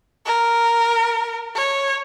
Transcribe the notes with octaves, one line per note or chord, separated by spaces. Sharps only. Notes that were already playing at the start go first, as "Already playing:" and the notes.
A#4
C#5